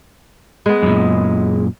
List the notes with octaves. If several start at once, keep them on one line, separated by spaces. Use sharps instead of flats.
G#3 B3
F#2 A#2